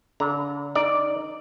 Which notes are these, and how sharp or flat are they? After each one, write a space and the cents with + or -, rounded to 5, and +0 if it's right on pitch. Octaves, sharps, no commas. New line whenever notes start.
D3 -40 A#5 +0
D#4 +0 D5 +0